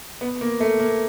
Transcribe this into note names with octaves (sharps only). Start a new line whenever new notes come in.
B3
A#3
A3
A#3